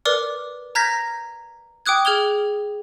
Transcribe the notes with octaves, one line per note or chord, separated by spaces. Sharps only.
A#4 B4 D5 D6 F6
A#5 F6 G6 G#6 A#6 B6
G5 D6 D#6 F#6 G#6
G#4 F6 G#6 F7 G7